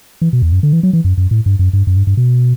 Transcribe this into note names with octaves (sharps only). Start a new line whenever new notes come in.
E3
B2
E2
F#2
D3
E3
F#3
E3
F#2
F#2
A2
G2
F#2
G2
F#2
G2
G2
B2